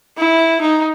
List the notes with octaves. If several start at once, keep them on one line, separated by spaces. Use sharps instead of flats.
E4
D#4